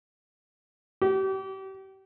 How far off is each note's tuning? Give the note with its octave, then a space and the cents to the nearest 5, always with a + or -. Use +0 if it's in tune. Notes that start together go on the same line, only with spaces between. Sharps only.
G4 -35